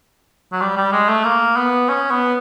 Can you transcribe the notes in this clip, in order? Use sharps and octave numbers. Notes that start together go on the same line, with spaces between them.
F#3
G3
G3
G#3
A3
A#3
B3
C#4
B3